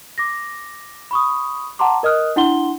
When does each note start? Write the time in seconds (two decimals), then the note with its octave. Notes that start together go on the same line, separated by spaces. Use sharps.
0.18 D6 A#6
1.11 B5 C#6 D#6
1.79 F#5 A5 A#5 C6 D6
2.03 A#4 D#5 D#6 F6 F#6
2.36 D4 E4 F#5 C6 G7